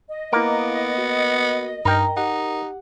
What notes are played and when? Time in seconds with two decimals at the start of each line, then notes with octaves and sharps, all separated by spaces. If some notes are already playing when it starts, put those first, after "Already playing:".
0.08 D#5
0.33 A#3 B3 E4 A#4 D6 D7
0.98 F#4
1.85 G2 D#4 A#4 G5
2.17 D#4 G4 F#5